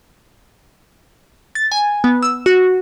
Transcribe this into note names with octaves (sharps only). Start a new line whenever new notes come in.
A6
G#5
B3
E6
F#4